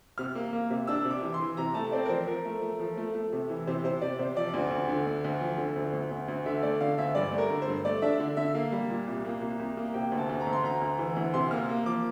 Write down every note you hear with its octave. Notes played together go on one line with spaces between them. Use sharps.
C3 F6
A#3
A#3
C3
D4 E6
C3
D6
E3
C6
E3
C3 A#5
A3 A5
C4 D5
A#4
F3 C5
F3 A#4
A3
A3
F3
A3
A3
C3
E3
C3 C5
C3 C5
C3 D5
C3 C5
F3 D5
D2
D2
D3
D2
D2
F3
D3
D2
D2
D2
D2
D3 E5
A3 D5
D3 F5
D2 E5
G2 D5
A3
A#4
D3
C5
G2
A3 D5
D4 E5
D3
D3 E5
A#3 F5
G3
A#2
C2
A#3
C2
C2
A#3
C3 G5
D2
A5
D2
A#5
D2
C6
D2 A#5
D2
E3
D2
C3 C6
A#3 F6
A#3
F3 D6